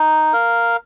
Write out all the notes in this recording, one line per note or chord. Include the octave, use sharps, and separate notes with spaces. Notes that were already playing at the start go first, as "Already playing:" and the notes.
Already playing: D#4
A#4 F5